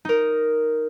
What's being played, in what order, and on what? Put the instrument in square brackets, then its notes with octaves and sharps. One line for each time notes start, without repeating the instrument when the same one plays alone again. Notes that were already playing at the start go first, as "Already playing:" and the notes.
[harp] D#4 A#4